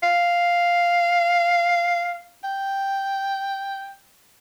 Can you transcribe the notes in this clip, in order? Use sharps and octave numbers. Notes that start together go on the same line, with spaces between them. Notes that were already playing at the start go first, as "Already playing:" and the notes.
F5
G5